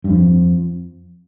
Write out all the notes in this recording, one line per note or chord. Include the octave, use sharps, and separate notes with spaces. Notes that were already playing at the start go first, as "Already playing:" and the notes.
G2
F2